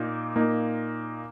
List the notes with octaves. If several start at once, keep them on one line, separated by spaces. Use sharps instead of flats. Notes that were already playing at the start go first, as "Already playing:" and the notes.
Already playing: A#2 A#3 D#4
A#2 A#3 D#4